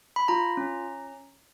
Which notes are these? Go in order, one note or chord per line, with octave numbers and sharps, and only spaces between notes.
B5
F4 A#5
C#4